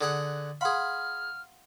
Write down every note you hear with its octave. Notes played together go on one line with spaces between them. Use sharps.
D3 G#4 F#5
G#4 F5 F#5 B5 C6 F6